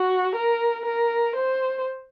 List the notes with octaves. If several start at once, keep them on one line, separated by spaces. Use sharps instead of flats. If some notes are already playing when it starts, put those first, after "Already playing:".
Already playing: F#4
A#4
A#4
C5